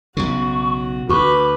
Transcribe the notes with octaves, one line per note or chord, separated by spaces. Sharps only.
B1 C#3 F#4 C#6
D2 F#4 B4 C#6 D6